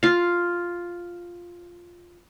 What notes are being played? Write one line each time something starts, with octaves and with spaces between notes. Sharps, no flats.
F4 F5